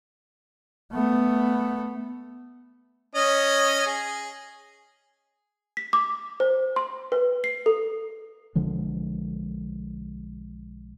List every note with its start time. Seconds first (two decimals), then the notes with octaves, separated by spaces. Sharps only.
0.93 A3 B3
3.15 C#4 D#5
3.86 G#4
5.77 B6
5.93 D6
6.40 C5
6.76 C6
7.12 B4
7.44 C7
7.66 A4
8.55 B1 D3 F3 G#3